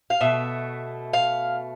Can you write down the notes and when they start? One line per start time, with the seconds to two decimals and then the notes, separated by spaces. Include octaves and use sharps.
0.10 F5
0.21 B2 A3 E5
1.13 F5